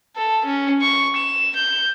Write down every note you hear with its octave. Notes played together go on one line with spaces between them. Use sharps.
A4
C#4
C#6
E7
G6